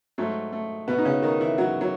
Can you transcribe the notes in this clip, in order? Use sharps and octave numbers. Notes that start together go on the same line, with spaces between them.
G#2 F#3 A3
A3
B2 B3
D#4
C#3 C#4
D#3 D#4
E3 E4
F#3 F#4
F#3